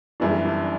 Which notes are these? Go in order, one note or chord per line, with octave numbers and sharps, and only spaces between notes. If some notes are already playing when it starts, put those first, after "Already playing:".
G1 F#2 E3 G3 D4
D4